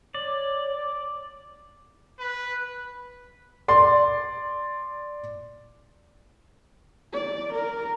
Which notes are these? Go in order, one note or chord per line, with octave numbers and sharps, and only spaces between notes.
C#5 D5
B4
D5 C6
D5
A#4